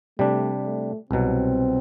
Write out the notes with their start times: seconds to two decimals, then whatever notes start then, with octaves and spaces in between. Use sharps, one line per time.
0.19 C3 G3 A3 D4
0.65 A3
1.11 C2 B2 F#3 C4